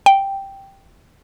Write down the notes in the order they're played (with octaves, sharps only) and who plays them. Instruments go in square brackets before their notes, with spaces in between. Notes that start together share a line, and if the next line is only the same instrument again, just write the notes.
[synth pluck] G5